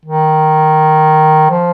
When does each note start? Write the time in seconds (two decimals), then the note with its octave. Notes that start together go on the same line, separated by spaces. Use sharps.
0.06 D#3
1.51 F3